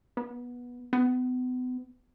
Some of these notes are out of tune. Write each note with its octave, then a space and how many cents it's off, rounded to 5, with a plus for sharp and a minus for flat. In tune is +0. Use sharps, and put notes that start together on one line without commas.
B3 -15
B3 +35